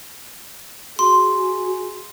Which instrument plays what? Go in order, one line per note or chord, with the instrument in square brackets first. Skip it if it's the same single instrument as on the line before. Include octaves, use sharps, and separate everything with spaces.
[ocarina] F#4 [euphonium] G#4 [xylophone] C6